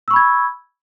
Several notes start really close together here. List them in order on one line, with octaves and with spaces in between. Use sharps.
E6 C#6 B5 G#6